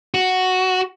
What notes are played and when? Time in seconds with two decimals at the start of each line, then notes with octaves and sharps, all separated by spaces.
0.14 F#4